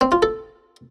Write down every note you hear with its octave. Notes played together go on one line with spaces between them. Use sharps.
C4
F4
A4